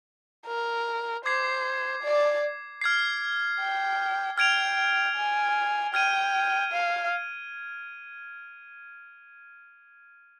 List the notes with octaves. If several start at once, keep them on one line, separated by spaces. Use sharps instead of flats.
A#4
C5 D6 G#6 C7
D5
F6 G#6 C7
G5
G5 F6 G#6 D7 F7
G#5
G5 F6 G#6 D#7
F5